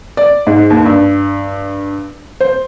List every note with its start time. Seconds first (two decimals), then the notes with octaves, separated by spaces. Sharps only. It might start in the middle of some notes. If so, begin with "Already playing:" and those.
0.17 D5
0.47 G#2
0.70 D#2
0.85 G2
2.41 C5